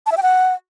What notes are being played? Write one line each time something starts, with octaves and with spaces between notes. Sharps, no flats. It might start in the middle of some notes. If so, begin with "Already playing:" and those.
A5
E5
G5
F#5